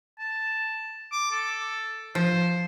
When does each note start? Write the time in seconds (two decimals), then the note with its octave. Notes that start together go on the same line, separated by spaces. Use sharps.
0.19 A5
1.12 D6
1.31 A4
2.15 F3 C5